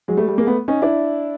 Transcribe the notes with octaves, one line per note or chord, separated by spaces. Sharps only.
F#3 G#3
G3 A3
G3 A3
G#3 A#3
A3 B3
C#4 D#4
D4 E4